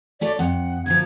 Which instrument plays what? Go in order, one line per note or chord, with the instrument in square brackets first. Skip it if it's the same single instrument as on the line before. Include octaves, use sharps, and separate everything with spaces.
[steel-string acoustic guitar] A3 A4 C#5 [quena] D5
[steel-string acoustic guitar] F2 [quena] F#5
[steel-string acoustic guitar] D2 A#2 F3 [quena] G#6